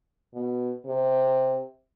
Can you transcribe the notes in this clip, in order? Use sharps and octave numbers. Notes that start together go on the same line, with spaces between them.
B2
C3